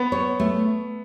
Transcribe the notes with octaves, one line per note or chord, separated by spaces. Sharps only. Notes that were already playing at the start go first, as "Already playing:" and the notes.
Already playing: B3
C#5
A3